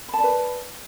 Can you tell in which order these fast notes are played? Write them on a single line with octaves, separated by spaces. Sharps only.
B5 A5 D5 B4